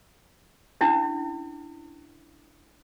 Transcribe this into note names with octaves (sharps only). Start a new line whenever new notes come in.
C#4 D4 E4